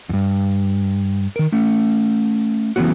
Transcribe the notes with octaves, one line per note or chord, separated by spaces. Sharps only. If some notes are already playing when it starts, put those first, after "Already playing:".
E2 G2
D#3 A#4
A3 C#4
E3 F#3 A3 B3 C#4 F#4